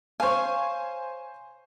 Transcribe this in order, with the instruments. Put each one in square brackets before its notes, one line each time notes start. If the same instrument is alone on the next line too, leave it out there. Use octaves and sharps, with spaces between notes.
[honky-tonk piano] C5 G#5 [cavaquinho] C#5 F5